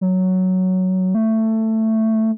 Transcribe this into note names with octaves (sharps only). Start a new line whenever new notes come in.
F#3
A3